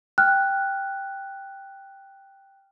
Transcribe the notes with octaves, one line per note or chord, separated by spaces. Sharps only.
G5 F6 F#6